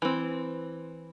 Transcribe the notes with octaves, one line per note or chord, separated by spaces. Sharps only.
E3 C4